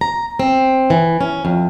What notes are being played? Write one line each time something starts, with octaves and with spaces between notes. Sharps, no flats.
A#5
C4
E3
C#4
F2